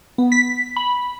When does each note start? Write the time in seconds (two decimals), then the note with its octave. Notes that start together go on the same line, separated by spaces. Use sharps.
0.18 B3
0.32 B6
0.76 B5